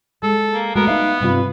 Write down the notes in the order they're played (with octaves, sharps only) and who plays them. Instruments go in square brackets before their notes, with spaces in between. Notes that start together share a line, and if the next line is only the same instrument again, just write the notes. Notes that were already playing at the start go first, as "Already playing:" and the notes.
[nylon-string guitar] G#3 [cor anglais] A4
[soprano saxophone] A#3
[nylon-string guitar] G#3 A3 F#4 [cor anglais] B3 [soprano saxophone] A#4
[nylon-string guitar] D#4 E5 [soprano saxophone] F5
[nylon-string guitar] G2 C3 F4 [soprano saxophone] B4